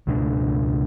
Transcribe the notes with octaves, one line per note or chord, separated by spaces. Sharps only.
C#2 B2 A3 D4